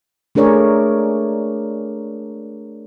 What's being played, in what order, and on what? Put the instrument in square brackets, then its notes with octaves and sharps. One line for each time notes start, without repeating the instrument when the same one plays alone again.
[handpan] A3 D4 G#4 A#4 C#5 D5